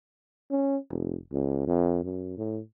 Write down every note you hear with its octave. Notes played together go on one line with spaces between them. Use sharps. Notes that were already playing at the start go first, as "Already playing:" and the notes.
C#4
F1
C#2
F2
F#2
A2